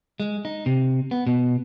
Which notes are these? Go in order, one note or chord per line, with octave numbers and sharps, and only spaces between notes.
G#3
D#4
C3
B3
B2